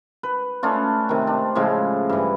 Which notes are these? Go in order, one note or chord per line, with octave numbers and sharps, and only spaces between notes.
B4
A3 C#4 D4 F4
C3 D#3
D4
A2 C#3 F3 G#3
G2 E3